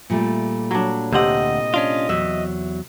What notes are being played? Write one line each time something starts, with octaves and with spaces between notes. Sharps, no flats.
A#2 G3 A3
F#3 D4
D2 C3 C4 D#5 F#5
C#4 D4 F4
E2 F#3 E5